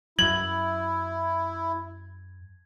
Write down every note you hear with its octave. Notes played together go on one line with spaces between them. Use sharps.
F#2 F#3 E4 G#6 F#7